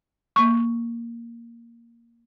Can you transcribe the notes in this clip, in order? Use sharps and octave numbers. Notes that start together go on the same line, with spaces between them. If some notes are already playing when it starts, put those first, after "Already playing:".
A#3 C#6